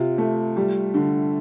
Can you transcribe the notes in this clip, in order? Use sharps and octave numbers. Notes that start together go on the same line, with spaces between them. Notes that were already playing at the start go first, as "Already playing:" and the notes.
Already playing: C3 F4
A3
G3
D3